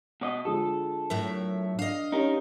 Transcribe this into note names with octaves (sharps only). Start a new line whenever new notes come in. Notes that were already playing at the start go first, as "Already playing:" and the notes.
B2 D5 D#5
D3 F3 G#3 A4
A2 F#3 A#4 E5
D4 D#5 F5
C#4 D#4 G4 A#4 C#5